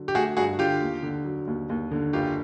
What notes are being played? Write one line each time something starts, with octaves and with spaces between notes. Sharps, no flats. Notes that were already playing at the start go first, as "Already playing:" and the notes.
Already playing: D3 F#3
G4
A3 F#4 G#4
G2 F#4 G#4
D3 F4 G4
D#2
D3
F#3
D#2
D#2
D3
F#1 F4 G4